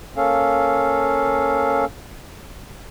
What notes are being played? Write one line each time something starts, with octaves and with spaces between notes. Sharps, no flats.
A#3 C#4 A4 F5